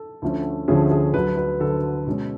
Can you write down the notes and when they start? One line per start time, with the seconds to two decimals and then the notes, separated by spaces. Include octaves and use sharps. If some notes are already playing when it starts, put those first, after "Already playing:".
Already playing: A4
0.22 D2 D3 F3 A3 C#4
0.68 D2 D3 F3 A3 C#4 G#4
0.91 G#4
1.14 D2 D3 F#3 B4
1.37 B4
1.60 D2 D3 F#3 A4
2.07 B2 G#3 C#4